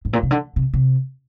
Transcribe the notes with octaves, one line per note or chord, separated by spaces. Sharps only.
G#2
A#2
C3
D3
C3
C3